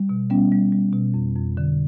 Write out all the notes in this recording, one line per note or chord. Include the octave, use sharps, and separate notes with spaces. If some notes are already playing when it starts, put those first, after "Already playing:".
Already playing: G3
B2
G3 B3 C#4
G3
G3
B2
F2
F2
D3